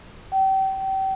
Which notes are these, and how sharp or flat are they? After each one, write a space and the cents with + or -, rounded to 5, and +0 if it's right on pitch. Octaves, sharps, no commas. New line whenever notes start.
G5 -30